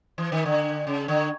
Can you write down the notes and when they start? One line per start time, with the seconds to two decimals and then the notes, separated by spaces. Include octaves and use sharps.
0.18 E3
0.32 D#3
0.46 D3
0.87 C#3
1.08 D3